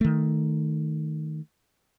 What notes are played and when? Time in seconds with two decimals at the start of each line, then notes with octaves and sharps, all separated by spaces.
0.01 D#3 A3